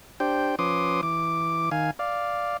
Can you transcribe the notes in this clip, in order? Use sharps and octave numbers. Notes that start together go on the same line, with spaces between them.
D4 G4 C5 G5
F3 C#4 B4 C6 D6 D#6
E3 D6
D#3 F5 G#5
D5 F5